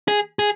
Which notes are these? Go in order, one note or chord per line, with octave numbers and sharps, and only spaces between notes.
G#4
G#4